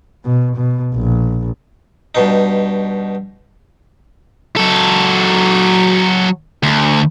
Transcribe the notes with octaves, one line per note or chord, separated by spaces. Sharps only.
B2
B2
A#1
G2 B2 D#4
F#3 A4
D2